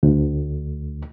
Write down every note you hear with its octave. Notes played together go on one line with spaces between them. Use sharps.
D2